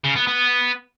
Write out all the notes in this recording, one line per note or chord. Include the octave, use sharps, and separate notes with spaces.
C#3
B3
B3